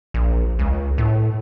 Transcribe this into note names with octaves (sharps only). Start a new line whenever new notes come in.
A#1
C#2
A2